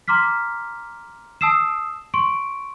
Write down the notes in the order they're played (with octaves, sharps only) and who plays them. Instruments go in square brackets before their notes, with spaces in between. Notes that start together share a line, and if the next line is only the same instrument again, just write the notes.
[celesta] A#5 C6 D6 F6 B6
A5 D#6 E6 C7 E7
C6 C#6 D7